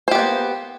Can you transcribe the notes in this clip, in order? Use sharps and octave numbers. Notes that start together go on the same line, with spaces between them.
A#3 B3 G4 C5